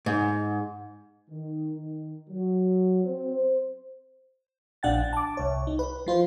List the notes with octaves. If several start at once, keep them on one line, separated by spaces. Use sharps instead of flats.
G#2
D#3
D#3
F#3
C4
C5
A#1 D4 F#5 G5 A6
A5 D6
C2 C#5
D#4
B4
F3 F4 C5